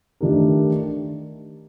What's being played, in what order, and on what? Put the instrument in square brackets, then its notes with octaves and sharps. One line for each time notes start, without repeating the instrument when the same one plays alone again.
[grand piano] D#3 A3 D4 G4 A#4